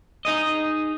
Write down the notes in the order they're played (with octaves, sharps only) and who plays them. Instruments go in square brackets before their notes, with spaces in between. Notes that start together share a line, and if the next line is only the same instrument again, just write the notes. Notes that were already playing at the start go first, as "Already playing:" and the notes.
[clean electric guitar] D#4 G#4 D#5